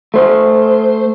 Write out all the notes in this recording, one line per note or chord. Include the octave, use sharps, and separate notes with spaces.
A3 C5